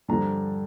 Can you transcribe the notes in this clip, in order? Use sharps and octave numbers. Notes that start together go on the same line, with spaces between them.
G2 D3 F3 A#5